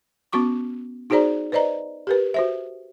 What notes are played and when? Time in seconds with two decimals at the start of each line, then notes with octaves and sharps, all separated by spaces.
0.33 B3 C#4 F#4 C#6 D6
1.10 D#4 F#4 G#4 C5 D5 A#5
1.52 B4 C5 D5 D#5 A#5
2.07 G4 A#4 B4
2.34 F#4 C5 E5